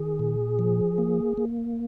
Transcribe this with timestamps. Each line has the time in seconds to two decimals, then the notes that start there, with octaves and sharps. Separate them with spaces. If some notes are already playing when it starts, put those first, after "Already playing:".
Already playing: D#3 G#4
0.19 A#2
0.59 F3
0.98 A#3
1.37 A#3